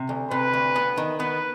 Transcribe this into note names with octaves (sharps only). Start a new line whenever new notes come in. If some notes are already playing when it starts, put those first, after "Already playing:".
Already playing: C3
D2
C3 B4
D2
B3
D#3
B3 B4